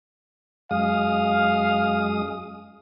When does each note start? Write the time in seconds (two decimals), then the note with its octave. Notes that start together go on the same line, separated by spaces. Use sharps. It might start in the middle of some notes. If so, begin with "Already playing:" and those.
0.71 F#2 G#3 F5 D#6